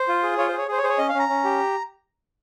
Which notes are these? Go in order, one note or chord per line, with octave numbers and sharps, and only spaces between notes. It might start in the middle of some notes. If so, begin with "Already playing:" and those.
Already playing: C5
F4
G#4
F4 C#5
C5
G#4
C#5
G#4 C5
C#5
G#4 C5
C#5
C#4 D#5
F5
C#4
A#5
C#4
G4